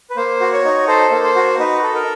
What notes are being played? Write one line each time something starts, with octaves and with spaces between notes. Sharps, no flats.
B4
A#3 C5
F#4
C#5
D#4
A4 C5
A#3
C5
F#4
D#4 B4
A4
A#4